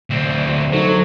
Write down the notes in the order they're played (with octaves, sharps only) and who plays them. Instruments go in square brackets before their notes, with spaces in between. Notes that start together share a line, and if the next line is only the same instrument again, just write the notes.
[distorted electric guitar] D2 C4
[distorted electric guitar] F#3 [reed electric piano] D#4 A4 C5